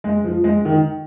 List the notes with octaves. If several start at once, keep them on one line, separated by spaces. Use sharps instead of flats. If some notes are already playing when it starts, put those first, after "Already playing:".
G#3
F3
G#3
D#3